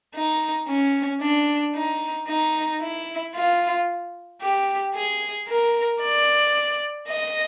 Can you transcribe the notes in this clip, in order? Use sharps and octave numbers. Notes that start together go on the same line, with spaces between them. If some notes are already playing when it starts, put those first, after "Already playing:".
D#4
C#4
D4
D#4
D#4
E4
F4
G4
G#4
A#4
D5
D#5